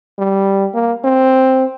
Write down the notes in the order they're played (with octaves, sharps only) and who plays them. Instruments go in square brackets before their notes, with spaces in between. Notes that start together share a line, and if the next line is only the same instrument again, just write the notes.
[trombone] G3
A#3
C4